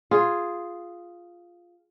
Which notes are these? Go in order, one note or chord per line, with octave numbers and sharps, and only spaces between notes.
F4 G#4